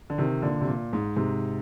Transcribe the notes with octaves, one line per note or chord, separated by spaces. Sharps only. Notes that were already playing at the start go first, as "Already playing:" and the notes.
D3
C3 D#3
A#2 D3
C3
A#2
G#2
G#2 C3